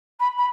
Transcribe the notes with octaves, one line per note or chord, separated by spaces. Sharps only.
B5
B5